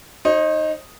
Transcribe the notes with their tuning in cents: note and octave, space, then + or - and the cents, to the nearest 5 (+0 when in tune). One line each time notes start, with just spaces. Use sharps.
D#4 +0 C5 +45